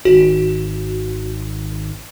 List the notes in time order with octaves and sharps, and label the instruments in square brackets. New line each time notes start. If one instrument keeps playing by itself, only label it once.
[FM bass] G#1 [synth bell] F#4